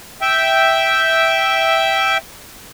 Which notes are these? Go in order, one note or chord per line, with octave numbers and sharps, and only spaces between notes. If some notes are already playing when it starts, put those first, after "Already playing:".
E5 G5